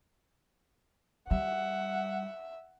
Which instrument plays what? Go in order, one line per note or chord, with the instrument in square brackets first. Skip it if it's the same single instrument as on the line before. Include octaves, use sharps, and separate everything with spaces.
[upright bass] G3 [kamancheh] E5 [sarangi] F#5